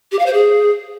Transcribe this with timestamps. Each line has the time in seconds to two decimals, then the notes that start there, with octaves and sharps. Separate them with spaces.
0.12 G4
0.19 F5
0.26 C5
0.33 G#4